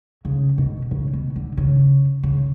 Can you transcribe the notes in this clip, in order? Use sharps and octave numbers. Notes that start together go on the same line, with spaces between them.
C#3
B2
C#3
B2
D3
C#3
C#3